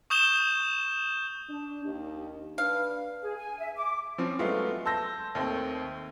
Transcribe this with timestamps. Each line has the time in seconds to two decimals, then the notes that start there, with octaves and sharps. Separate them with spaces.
0.10 C#6 D#6 G6 E7 G7
1.49 D4
1.85 D#2 D#4 G4
2.58 D4 B4 F5
3.22 G#4
3.36 G#5
3.59 E5
3.77 D6
4.18 F3 C4 C#4
4.39 F#3 G#3 A3 B3 F4
4.85 A5 C6 E6 G6 A#6
5.35 D#2 A3 C4